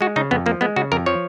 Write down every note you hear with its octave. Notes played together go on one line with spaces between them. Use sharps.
G#3 F#4
C#3 D#4
F2 B3
F3 A#3
G#3 B3
C#3 F#4
F2 A#4
F3 C#5